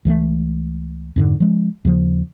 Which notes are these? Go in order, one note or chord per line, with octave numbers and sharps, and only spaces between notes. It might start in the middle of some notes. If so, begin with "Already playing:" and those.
C#2 E3 G3 A3
F2 G#2 D3
F3 G#3 C#4
D#2 C#3 F3